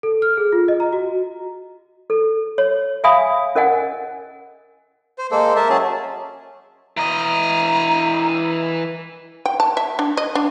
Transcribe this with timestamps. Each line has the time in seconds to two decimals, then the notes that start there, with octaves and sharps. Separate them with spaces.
0.03 A4
0.22 F6
0.37 G#4
0.52 F4
0.68 D#5
0.80 A#5
0.93 F#4
2.10 A4
2.58 C#5
3.04 E5 F5 G#5 B5 D#6
3.55 C#4 A#4 D#5 F#5 G#5
5.18 C5
5.31 G#3 A#3 A4 C5
5.56 A#4 E5 A5
5.69 F#3 C#4 G#4 A5
6.97 E3 D#5 A#5
9.46 G5
9.60 A5
9.77 E5
9.99 D4
10.17 D#5
10.35 D4